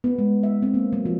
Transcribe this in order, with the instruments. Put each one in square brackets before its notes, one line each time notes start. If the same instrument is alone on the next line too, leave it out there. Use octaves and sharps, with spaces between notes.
[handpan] B3
G#3
E5
C4
A#3
F#3
F3